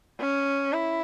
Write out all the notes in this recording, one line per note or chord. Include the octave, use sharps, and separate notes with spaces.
C#4
E4